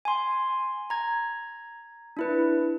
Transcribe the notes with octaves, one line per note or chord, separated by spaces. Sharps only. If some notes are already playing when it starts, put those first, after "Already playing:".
G#5 C6
A#5 G#6
D4 E4 B4